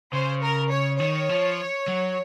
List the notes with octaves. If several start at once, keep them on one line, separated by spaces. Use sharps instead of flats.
C#3 C5
A#4
C#5
D#3 C#5
F3
F#3